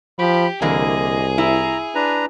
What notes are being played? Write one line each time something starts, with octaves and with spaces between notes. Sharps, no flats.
F3 G4 B5
C2 D3 E3 A#3 G#4 D#5
E4 A#5
D4 B4 A#5